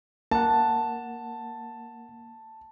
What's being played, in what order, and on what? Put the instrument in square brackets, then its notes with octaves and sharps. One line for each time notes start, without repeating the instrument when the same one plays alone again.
[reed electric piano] A#3 F#5 [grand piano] A5